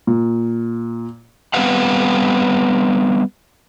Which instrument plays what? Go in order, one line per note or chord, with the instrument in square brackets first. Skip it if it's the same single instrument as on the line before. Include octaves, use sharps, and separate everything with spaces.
[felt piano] A#2
[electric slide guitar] G3 B3 C4 B4 F5 F#5